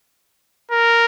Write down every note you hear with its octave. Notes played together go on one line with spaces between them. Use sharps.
A#4